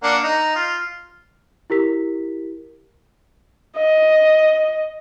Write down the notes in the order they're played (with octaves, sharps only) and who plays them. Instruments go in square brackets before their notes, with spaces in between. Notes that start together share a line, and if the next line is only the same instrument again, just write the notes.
[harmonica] A#3 D4 F#5
D#4 A#5
F4
[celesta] E4 G4 A#4 B6
[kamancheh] D#5